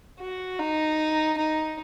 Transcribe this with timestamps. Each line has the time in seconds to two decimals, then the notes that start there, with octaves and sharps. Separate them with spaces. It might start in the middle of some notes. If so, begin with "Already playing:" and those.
0.19 F#4
0.59 D#4
1.37 D#4